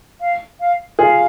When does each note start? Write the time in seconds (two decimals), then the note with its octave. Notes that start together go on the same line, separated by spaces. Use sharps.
0.20 F5
0.60 F5
0.99 F4 G#4 F5